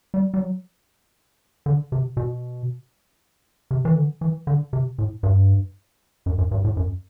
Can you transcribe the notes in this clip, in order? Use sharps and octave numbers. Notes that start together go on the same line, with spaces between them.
G3
G3
F#3
D3
C3
B2
C3
E3
D3
E3
D3
C3
A2
G2
F#2
F#2
G2
A2
F#2